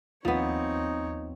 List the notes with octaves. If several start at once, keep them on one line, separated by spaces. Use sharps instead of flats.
G#1 D#2 F3 B3 C4 D#4 C#5